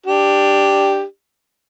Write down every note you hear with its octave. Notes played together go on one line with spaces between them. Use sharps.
D4 G4